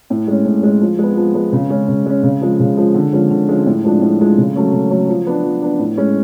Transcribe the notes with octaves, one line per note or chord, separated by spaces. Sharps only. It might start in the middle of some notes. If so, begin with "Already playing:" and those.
A2
G#3 C#4
A2
G#3 C#4
F3
G#3 B3
F3
G#3 B3
C#3
G#3 C#4
C#3
G#3 C#4
C#3
F3 G#3
C#3
F3 G#3
D3
F3 G#3 C#4
D3
F3 G#3 C#4
A2
F3 G#3 D4
A2
F3 G#3 D4
C#3
F#3 A3 C#4
C#3
F#3 A3 C#4
F3
B3 D4
F3
B3 D4
A2
G#3 C#4